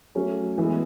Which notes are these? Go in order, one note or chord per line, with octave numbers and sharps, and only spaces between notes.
F#3 A3 C#4
E3 G#3 B3